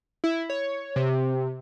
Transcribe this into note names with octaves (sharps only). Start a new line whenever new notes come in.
E4
C#5
C3